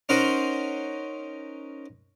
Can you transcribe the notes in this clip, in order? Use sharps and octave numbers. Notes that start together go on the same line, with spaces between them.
C#4 D#4 A#4 C5 F#5